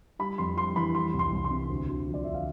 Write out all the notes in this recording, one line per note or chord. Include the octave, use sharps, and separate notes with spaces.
G3 B5
F2 C6
G3 C6
E3 B5
G3 C6
C2
C6
C2
C6
C3
D2
D2
F3
D5
D2 E5
F5